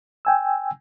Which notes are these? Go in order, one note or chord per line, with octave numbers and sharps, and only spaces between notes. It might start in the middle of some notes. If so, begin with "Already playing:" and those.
G5 G#5 E6